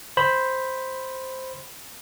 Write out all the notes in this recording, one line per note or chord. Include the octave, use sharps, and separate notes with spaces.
C5 B5